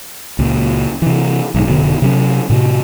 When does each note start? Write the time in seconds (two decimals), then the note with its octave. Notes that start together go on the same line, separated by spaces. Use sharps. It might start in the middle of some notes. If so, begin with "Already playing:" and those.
0.39 C#2 A#2
1.02 C3 E3
1.55 B1 G#2
1.67 F1 B2 D3
2.02 C3 F#3 C#4
2.50 A2 C3